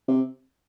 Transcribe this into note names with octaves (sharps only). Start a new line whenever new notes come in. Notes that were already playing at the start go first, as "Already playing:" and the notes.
C3